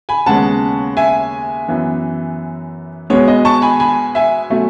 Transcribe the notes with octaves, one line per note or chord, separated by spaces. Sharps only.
G#5 B5
D#2 C#3 G#3 B3 F#5 A5
E5 G#5
F#2 E3 B3
B2 G#3 B3 C#5
D#5
A5 C#6
G#5 B5
G#5 B5
E5 G#5
B2 F#3 A3